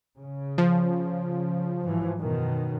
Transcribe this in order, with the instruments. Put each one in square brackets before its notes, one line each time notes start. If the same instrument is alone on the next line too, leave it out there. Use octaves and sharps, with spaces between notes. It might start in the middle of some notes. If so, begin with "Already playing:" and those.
[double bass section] C#3
[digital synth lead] F3
[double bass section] G#2 E3 F#3
F#2 B2 D#3